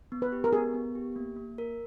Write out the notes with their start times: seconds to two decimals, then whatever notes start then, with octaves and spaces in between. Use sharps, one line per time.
0.12 B3
0.22 B4
0.32 G4
0.44 A#4
0.53 B3 G#4
0.74 B3
0.95 G4
1.16 A#3
1.36 A#3
1.58 A#4